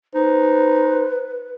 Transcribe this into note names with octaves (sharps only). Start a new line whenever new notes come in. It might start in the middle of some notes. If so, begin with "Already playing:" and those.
D#4 B4 C5